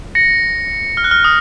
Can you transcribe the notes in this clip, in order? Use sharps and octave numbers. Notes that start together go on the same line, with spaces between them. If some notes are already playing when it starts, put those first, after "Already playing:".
A#6 C#7
F6
F#6
F6
D#6